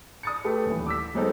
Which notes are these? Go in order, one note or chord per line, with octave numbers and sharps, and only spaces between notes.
D#6 A6 C#7
A3 G4 B4
D#1 E3
D6 E6 B6
F#3 G#3 B3 C4 D#4 A4